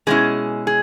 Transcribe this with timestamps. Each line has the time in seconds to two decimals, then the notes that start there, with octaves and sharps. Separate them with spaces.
0.07 B2 G#3 C#4 E4 G#4
0.67 G#4